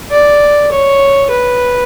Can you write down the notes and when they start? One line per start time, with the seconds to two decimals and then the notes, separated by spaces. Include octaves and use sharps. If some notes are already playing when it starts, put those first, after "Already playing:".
0.11 D5
0.72 C#5
1.31 B4